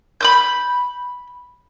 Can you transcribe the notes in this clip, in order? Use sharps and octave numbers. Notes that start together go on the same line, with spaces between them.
B5 D#6 G6